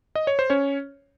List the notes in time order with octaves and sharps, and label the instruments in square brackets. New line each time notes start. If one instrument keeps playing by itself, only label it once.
[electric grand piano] D#5
C#5
C5
C#4 C#5